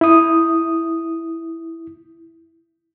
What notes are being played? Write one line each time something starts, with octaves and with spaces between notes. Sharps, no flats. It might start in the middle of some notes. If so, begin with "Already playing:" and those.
E4 D#6